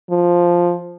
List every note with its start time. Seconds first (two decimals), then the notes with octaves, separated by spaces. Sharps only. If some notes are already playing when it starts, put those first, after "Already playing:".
0.10 F3